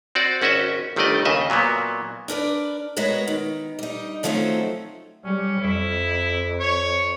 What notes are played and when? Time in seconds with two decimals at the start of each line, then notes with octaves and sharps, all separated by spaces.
0.15 C4 F#4 D5
0.42 G#1 C#4 F#4 D#5 E5
0.96 G1 D#3 G3 A3 D5 D#5
1.25 D#2 C#3 D#5 E5
1.50 A#2 F#3 A#3 B3
2.28 D4 A#4 B4 D5
2.96 G#3 B3 F#4 A#4 B4 C#5
3.28 D#3
3.79 G3 D#4
4.23 D#3 F3 F#3 A3 C4 C#4
5.25 G3 C#4
5.62 F2 E4
6.60 C#5